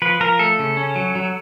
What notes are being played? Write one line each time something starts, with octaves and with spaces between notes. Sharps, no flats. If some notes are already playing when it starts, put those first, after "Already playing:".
F3 B4
F3 A#4
A3 A4
C#3
C#4
F#3
F#3